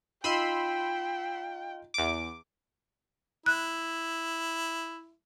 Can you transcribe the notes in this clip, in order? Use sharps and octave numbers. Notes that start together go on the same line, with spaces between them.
D#4 F4 G5 B5 C6 E6 D#7
E2 D6
E4 F#6